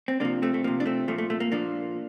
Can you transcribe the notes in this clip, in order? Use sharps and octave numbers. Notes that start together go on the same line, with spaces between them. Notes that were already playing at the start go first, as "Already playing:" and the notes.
C4
C3 F3 A#3 D4
A3 C4
A3
C3 F3 A#3
D4
A3 C4
A#2 F3 A3
A3
A3
A#3
A#2 F3 A#3 D4